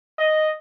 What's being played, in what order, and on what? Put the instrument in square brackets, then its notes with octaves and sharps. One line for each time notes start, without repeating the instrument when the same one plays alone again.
[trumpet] D#5